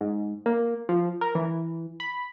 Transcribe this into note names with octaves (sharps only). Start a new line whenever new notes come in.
G#2
A#3
F3
A#4
E3
B5